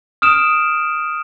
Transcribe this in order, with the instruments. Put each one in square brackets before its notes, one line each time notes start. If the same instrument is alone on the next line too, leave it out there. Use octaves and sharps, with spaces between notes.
[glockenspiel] D#6 F6 D7 E7